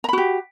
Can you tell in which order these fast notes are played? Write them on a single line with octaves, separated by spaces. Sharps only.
A#5 B5 F#4 G4